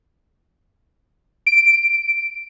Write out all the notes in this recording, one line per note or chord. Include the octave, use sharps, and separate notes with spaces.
D7